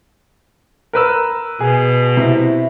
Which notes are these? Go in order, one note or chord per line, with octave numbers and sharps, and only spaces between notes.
A#4 B4 E6
B2 G#4
C3 E4